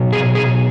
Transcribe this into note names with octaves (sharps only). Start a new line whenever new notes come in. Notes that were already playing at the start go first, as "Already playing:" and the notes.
Already playing: B2 F#3
G#4
G#4